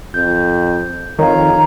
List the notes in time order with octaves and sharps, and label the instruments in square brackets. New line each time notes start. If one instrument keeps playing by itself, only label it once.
[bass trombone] F2 [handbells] G6
[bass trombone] F2 [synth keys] D#3 [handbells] C#5 F5 [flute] A#5